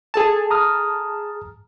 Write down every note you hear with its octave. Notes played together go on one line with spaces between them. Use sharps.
G#4 A4 A5
A#5 D#6 F6